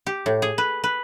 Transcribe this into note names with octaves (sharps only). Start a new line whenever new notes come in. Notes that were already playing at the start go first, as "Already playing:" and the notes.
G4
A2
G#4
B4
B4